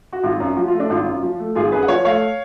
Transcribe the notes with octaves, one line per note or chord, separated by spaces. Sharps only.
F#4
G#1 F4
F#2
F3 F#4
F4
A3
D4
G#1 F4
F#2
F3
A3
G#1 F4 G#4
F#2 G#4 B4
F#5
F3 C#5 F5
A3 C#5 F5